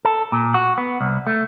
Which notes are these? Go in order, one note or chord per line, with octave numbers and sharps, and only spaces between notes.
A4
A#2
F#4
B3
C2
A3